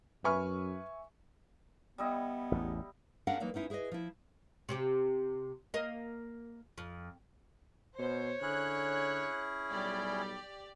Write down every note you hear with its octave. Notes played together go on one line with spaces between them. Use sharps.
F#2 B4 E5 G#5 C#6 F6
G3 B3 E4 D#5
A1 E2
C#4 D4 G#4 A#4 F5 F#5
E3 F#3 A#3 D#4
B3 C#4 D#4 E4
E4 G#4 B4 C5 D#5
F3 E4
C3 C4 G4
A#3 A#4 D#5
F2
B2 C5 C#5
D3 C#4 E4 G#4 F#6
B1 G3 G4 D5